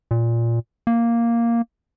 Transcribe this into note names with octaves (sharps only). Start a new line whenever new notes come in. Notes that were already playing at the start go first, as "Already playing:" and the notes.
A#2
A#3